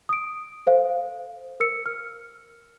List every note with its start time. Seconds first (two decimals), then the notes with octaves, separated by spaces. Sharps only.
0.09 D#6 D7
0.66 A4 C5 F5
1.60 A#4 E6 C#7
1.86 F6